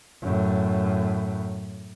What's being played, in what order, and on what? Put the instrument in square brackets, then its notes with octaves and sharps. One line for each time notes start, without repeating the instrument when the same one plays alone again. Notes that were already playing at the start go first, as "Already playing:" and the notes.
[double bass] F#2 A2